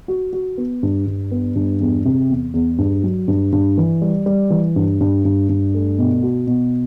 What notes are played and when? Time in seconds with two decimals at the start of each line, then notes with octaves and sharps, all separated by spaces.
0.08 F#4
0.33 F#4
0.58 B3
0.83 G2
1.07 G2
1.31 B3
1.55 G2
1.80 E2
2.05 C3
2.30 E2
2.54 E2
2.78 G2
3.03 F#3
3.28 G2
3.52 G2
3.78 E3
4.02 G3
4.26 G3
4.50 E3
4.76 G2
5.00 G2
5.25 G2
5.49 G2
5.74 A3
5.98 B2
6.23 F#4
6.47 B2